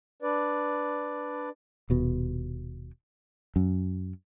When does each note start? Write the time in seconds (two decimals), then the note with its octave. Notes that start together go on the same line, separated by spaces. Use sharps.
0.22 D4 B4 D5
1.90 D#1 B2
3.56 F#2